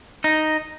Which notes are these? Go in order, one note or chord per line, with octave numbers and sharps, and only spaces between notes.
D#4